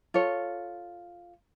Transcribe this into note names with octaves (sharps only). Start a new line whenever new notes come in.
F4 A4 C#5